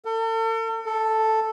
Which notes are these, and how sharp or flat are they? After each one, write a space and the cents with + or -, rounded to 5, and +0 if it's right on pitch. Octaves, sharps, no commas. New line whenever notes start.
A4 +40
A4 +0